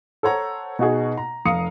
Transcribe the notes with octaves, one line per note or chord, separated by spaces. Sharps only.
A4 C5 C#5 F#5 A#5
B2 D#4 F#4 G#4
A#5
F1 F5 A#5 D#6 C#7